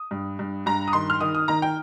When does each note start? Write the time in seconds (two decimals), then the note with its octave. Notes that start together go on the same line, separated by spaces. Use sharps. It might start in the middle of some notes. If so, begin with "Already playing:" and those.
Already playing: D#6
0.11 G2
0.39 G2
0.66 G2 A#5
0.88 D#6
0.93 D#3 C6
1.10 F6
1.21 D#3 D#6
1.35 D#6
1.48 D#3 A#5
1.62 G5